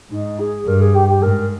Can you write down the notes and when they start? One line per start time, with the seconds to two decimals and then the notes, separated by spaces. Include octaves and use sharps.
0.10 G#2 D#4
0.39 G#4
0.66 G2 A#4
0.81 G#4
0.94 G4
1.08 G4
1.22 G#2 A#4